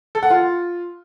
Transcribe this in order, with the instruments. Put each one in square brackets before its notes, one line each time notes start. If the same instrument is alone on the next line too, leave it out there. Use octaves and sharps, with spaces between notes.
[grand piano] A4
F#5
F4